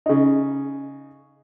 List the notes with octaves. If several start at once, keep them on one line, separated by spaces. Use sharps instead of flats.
C#3 D#4